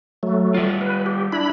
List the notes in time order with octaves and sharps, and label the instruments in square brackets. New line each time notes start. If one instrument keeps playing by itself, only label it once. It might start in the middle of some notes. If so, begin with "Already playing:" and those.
[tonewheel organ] F#3 A3
[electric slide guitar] G3 F4
[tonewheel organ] B4
G4
D4 E4 B5